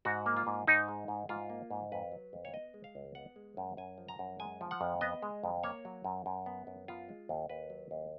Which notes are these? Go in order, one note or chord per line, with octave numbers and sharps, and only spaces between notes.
G#2 F#4
A#3
F4
G#2
G#2 D#4
G#3
G#2
G#2 F4
A#3
G#2
F2 B4
F#3
F2
C#5
B3 D#5
G#3
F5
C#2
B3 F#5
G#3
F#2
F#2 G#5
F3
A#5
F#2
G#3 G#5
F3
F#5
F2
B3 D#5
G#3
F2
A#3 C#5
F#3
F#2
F#2
B3
F#2
B3 F4
G#3
D#2
D#2 B4
F#3
D#2